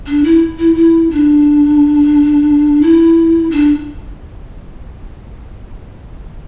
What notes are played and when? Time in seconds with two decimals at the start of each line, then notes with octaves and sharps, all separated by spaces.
0.06 D4
0.24 E4
0.59 E4
0.75 E4
1.10 D4
2.82 E4
3.50 D4